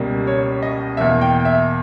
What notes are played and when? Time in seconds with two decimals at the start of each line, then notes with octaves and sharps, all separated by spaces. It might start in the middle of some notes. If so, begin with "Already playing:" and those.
Already playing: C#2 B2 G3 A#3
0.27 C#5
0.63 D#5
0.97 E2 B2 A#3 E5
1.21 G5
1.45 E5